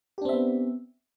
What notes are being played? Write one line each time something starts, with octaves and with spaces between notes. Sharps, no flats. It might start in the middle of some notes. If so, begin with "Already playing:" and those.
B3 C4 D4 G4 E5